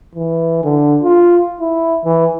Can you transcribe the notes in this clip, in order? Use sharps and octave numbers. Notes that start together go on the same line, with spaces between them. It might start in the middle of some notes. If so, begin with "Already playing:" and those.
E3
D3
F4
E4
E3